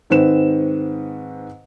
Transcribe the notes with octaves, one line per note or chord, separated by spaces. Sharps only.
G#2 D#3 C4 B4 E7